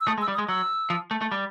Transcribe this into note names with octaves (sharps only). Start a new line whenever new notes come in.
E6
A3 D#6
G#3
E6
G3
D#6
G#3
F#3 E6
F3
A3
A3
G3